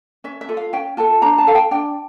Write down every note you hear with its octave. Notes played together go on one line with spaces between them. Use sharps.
C#4 E5
E5
F4 A4
F5
C#4 G5
F4 A4 A5
D4 A#5
A5
A4 F5
G5
D4 G5